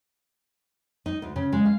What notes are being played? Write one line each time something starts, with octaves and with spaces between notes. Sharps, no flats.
D#4
D2
C#3
G#3
F5